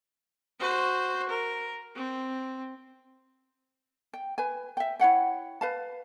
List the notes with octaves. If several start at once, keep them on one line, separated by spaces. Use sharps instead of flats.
F#4 C5
A#4
C4
G5
B4 G#5
E5 G5
E4 C#5 F#5 G5
B4 F5 A5